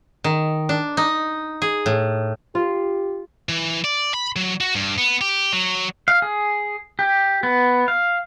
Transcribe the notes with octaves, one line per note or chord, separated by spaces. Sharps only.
D#3
D4
D#4
G#4
A2
F4 G4
E3
D5
B5
F#3
F#4
G2
B3
G4
F#3
F5
G#4
G4
B3
F5